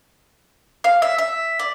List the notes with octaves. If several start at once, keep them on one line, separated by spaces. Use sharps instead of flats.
F5
E5
E5
D5